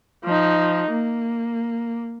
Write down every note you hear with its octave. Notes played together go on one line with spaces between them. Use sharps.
F3 D#4
A#3